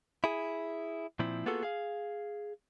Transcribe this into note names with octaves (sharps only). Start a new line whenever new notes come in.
E4 G#4
A#2 F3 C4 E4
A#3 B3 F4 F#4 G#4 A4
G#4 F5